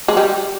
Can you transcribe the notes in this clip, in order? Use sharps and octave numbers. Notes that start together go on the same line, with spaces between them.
G#3
G3